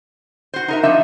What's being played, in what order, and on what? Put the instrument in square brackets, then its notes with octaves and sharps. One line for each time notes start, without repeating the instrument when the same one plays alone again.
[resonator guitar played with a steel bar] F#4 C5
D#4 A#4 E5
[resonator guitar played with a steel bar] F3 D#4 [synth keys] D4 E5